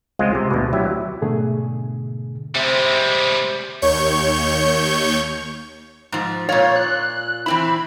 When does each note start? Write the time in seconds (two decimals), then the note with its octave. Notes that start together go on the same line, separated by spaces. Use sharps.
0.19 C#2 G#3 C4 F4 D#5
0.35 C3
0.51 D2 B2
0.73 D2 F#3 E4 G4 E5
1.21 G#2 B2 D3 A3 G#4
2.55 C3 G3 G#3
3.82 D#2 C#5 C#6 G6
6.12 G#2 F3
6.49 A#2 F4 C#5
6.76 F#6
7.46 E3 C4 E4 B5